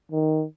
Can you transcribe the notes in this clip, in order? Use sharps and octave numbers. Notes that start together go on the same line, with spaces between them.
D#3